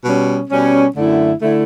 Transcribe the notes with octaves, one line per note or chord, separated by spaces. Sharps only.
B2 G3 C#4
B2 G3 C#4
F#2 D3 A3 E4
D3 A3 E4